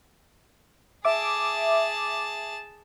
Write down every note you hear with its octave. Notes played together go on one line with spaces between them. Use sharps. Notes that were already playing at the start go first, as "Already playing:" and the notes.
G#4 E5 A5 D6